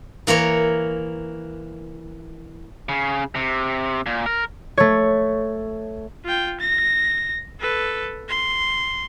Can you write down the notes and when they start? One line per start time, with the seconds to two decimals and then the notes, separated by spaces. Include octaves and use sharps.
0.27 E3 A#3 A#4 C#5
2.89 C#3
3.35 C3
4.06 A#2
4.26 A#4
4.77 A3 C#5
6.25 F4 G5
6.60 A#6
7.60 A4 B4
8.28 C6